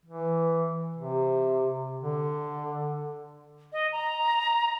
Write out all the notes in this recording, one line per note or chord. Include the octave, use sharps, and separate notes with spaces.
E3
C3
D3
D#5
A#5